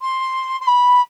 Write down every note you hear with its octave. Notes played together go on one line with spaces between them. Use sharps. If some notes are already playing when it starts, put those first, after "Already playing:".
C6
C6
B5